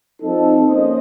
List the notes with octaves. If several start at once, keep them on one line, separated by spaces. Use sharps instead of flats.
F3 C4 D#4 A4
A#3 C#4 A4 C5 D#5